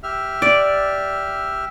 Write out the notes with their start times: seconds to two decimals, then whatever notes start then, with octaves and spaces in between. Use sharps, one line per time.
0.03 G4 E5 F6
0.42 D5